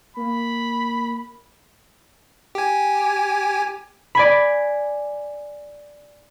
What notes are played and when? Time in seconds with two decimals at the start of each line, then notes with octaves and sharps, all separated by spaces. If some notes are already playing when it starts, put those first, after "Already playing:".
0.17 A#3 B5
2.55 G4 G#5
4.15 D5 G#5 B5